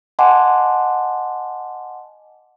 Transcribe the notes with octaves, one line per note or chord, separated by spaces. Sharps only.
D#5 F#5 G#5 A5 C6 D6